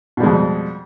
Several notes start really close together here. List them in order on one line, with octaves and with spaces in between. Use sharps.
B2 G3 G#3 F2